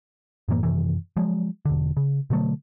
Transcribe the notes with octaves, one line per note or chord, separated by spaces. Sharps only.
F#2 A2 E3 A#3
F#2 C3 D#3 E3
F3 F#3 G#3
E1 D3
C#3
B2 D3 F#3 A3